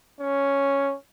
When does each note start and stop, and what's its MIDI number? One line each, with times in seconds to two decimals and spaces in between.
0.20 0.95 61